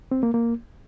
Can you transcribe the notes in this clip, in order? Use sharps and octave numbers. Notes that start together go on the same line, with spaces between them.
C4
A#3
A#3